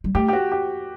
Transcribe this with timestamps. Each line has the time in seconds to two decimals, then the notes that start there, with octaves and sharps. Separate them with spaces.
0.04 G3
0.15 A3 G4
0.28 G4
0.33 F#4
0.52 G4